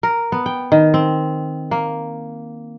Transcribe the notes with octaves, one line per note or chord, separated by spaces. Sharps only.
A#4
B3
G5
D#3
C4
A#3